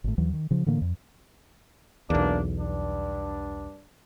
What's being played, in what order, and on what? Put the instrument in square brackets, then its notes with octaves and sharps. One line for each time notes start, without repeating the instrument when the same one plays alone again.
[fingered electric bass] G#1 A2
D#2 E3 F#3
D#3
C#3 F3
A2 D3 E3 A#3
F2
[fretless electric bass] B1 E2 [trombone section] A#3 D4
[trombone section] G2 D4